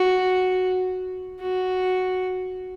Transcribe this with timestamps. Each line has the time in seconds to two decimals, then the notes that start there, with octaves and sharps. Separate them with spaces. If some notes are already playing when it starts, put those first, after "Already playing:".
Already playing: F#4
1.40 F#4